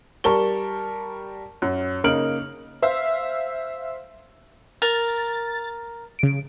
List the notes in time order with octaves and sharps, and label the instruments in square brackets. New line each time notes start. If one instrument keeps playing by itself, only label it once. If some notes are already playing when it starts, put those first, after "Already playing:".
[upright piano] G3 A#4 A5 C#6 G7
F#2
C#3 A#3 D#4 F6 D7 F#7
[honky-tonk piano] C5 E5 F5
[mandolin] A#4 [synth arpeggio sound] A6
[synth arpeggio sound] C#3 D7